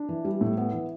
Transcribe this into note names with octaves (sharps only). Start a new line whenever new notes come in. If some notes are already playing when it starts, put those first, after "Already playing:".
Already playing: D4
E3
G3
A2
B3
E3